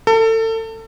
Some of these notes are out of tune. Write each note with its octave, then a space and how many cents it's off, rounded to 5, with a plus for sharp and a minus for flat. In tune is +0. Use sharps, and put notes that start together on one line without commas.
A4 +30